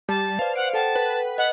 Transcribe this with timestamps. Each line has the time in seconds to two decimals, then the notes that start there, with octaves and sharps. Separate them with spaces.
0.09 G3 A5
0.39 B4 C5 D5 F5
0.56 C5 F#5 C#7 D7
0.74 A4 F#5 G5 A5
0.96 B4
1.38 D#5 F#5